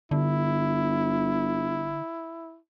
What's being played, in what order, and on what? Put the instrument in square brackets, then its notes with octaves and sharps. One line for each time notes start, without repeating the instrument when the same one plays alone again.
[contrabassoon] G1 [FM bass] D3 [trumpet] E4